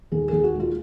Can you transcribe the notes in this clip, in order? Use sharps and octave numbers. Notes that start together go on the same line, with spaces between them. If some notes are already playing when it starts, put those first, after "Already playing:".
D#2 G#4
D#2 G#4
F#4
G#3 F4